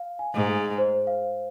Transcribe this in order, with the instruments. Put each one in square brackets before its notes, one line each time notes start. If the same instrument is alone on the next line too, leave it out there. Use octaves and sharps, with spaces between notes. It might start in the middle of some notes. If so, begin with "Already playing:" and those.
Already playing: [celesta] F5
G#5
[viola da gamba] G#2
[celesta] G#4
C5
F5